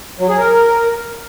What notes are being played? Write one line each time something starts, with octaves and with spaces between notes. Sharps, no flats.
F#3
G#4
A#4